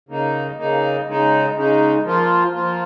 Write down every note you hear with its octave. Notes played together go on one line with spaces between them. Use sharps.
C#3 A#3 D#4
C#3 A#3 D#4
C#3 G#3 D#4
C#3 G#3 D#4
F3 A#3 F4
F3 A#3 F4